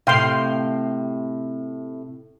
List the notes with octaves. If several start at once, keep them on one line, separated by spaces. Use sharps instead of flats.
A2 C3 F5 G5 C6